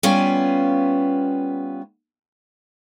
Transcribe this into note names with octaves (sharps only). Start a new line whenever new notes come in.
G3 B3 C#4 F4 F5